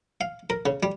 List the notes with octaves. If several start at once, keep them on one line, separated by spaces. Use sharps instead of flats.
F5
A#4
C#3
G3